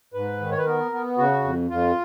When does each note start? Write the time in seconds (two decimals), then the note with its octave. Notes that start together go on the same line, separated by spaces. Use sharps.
0.14 G#2 B4
0.40 D#3
0.52 C#5
0.58 B4
0.66 B3 A#4
0.92 B3
1.18 C#3 F#4
1.44 F2
1.70 F2 F4